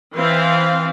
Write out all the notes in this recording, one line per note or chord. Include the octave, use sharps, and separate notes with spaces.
E3 C4 F5